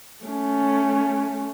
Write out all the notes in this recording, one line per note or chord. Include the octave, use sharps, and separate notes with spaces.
A3 C#4